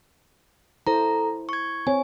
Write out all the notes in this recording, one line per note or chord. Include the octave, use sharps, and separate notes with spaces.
E4 A4 C5 A#5
C#6 G#6
C4 C#5 G#5